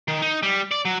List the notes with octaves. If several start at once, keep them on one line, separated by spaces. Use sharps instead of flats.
D#3
D#4
G3
D5
F#3